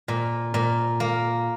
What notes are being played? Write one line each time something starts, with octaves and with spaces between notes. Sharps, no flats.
A#2
A#2
A#3